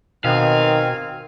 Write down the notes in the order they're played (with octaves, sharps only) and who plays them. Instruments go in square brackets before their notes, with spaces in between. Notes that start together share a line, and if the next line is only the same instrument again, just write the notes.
[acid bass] B2 [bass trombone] D#3 [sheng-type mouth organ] C4 G#5 [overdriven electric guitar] F5